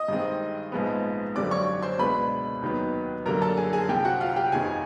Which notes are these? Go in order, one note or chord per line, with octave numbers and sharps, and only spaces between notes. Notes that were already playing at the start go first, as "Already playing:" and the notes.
Already playing: D#5 D#6
G2 D#3 G#3 C4
A#1 G#2 F3 G#3 B3
G#1 F#2 D3 G3 C4 D5 D6
C#5 C#6
C5 C6
C#2 B2 G#3 B3 D4 B4 B5
D#2 D#3 F#3 B3
F#2 D3 G3 A#3 D4 A#4 A#5
A4 A5
G#4 G#5
G#4 G#5
C2 C3 F3 G4 G5
F#4 F#5
F4 F5
G4 G5
G1 F2 C3 D#3 G#4 G#5